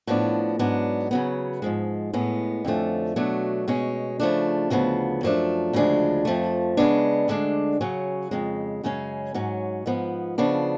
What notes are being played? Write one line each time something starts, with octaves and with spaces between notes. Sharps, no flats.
A2 F3 B3 D4
G#2 F#3 B3 D4
C#3 F#3 B3
G#2 F3 G#3
A2 G#3 B3
F2 D3 F3 A3 C#4
B2 F#3 A3 D4
B2 G#3 C#4
C#3 F3 A3 D4
D2 C#3 F3 B3
F#2 F3 A3 D4
D2 C#3 F3 G#3 D4
F2 F3 A3
C#3 G#3 B3 D4
D2 D3 G#3 D4
C#3 F#3 C#4
F2 C#3 G#3
F#2 C#3 G#3 C#4
G#2 F#3 C#4
G#2 F3 B3
C#3 F3 B3 D4